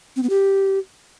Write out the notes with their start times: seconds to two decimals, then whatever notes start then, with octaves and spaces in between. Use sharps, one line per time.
0.16 C4
0.23 B3
0.30 G4